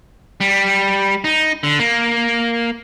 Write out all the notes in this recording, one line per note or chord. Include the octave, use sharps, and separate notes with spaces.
G3
D#4
D3
A#3